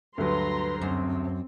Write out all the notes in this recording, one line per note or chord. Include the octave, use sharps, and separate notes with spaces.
D2 G2 F#3 B4 A#5 C6
F#2 C4